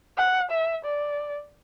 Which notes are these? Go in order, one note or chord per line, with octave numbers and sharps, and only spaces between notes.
F#5
E5
D5